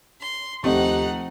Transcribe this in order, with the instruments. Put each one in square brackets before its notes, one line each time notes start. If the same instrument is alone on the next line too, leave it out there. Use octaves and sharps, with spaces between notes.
[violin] C6
[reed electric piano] D#2 G4 D#5 [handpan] F3 C4 [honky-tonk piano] A3 [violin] D#4 F#5